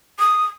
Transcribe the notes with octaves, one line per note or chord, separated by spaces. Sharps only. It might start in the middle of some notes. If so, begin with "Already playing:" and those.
D#6